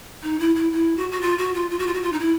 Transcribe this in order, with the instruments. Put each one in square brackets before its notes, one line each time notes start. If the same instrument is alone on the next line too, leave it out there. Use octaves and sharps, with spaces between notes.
[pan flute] D#4
E4
E4
E4
F#4
F#4
F4
F#4
F4
F4
F#4
F4
F#4
F4
D#4
E4